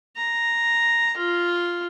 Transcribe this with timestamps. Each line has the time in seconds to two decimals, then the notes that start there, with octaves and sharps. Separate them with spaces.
0.16 A#5
1.17 F4